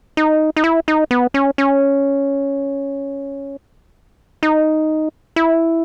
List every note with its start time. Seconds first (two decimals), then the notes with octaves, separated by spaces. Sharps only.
0.17 D#4
0.57 D#4
0.64 E4
0.88 D#4
1.11 B3
1.34 C#4
1.58 C#4
4.43 D#4
5.36 E4